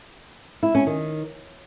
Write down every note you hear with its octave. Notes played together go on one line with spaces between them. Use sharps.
E4
C#4
D#3